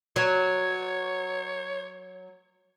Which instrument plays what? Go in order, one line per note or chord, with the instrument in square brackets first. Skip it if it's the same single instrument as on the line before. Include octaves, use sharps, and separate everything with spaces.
[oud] F#3 [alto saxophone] C#5